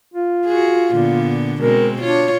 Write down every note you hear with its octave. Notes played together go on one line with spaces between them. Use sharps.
F4
F#4 G#4
A#2 D3 B3
B2 G#3 C4 A#4
D4 F4 C#5